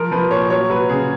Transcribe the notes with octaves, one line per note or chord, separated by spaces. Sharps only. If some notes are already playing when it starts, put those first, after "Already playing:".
Already playing: F3 A#4
F3 B4
A#2 C#5
F#3 C#5
F#3 B4
C#3 G#4